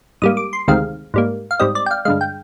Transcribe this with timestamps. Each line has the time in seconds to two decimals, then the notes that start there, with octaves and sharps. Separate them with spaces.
0.22 G#2 G3 A#3 D#6
0.37 D6
0.53 C6
0.68 D2 C3 D#3 G#3 C4 F5
1.14 G#2 G3 A#3
1.51 F5
1.60 G#2 G3 C4 D#5
1.75 D5
1.86 G5
1.91 F5
2.05 G2 D3 G#3 F5
2.21 G5